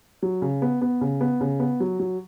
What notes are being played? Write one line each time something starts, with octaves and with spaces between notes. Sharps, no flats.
F#3
C#3
B3
B3
C#3
B3
C#3
B3
F#3
F#3